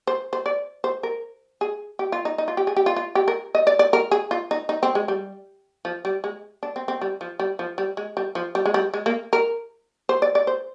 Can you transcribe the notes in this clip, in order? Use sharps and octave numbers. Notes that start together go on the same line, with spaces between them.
C5
C5
D5
C5
A#4
G#4
G4
F4
D#4
D#4
F4
G4
G#4
G4
F4
F4
G4
A#4
D#5
D5
D5
A#4
G#4
F4
D#4
D#4
C4
G#3
G3
F3
G3
G#3
D4
C4
C4
G3
F3
G3
F3
G3
G#3
G3
F3
G3
G#3
G3
G#3
A#3
A#4
C5
D5
D5
C5